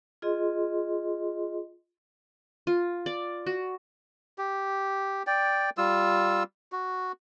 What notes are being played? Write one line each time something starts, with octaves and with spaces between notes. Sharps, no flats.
F4 G#4 D#5 C6
F4
D5
F#4
G4
D5 G5
G3 F4 E6
F#4